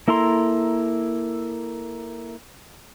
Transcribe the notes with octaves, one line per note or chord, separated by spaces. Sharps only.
A#3 E4 A4 A#5 C6